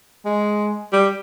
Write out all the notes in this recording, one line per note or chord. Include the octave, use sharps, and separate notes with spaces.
G#3
G3